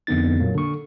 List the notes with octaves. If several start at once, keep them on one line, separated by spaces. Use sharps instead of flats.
F2 D3 B3 D#4 A6
A#2 F#3 A#3
D3 C#6